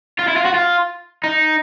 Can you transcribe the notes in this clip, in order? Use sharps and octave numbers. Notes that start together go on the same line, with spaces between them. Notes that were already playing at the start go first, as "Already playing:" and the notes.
F4
E4
F4
F#4
F4
D#4